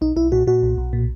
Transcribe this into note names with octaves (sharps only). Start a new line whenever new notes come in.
B1 D#4
B1 E4
A#2 F#4
A#2 F#4
B1
B1
A#2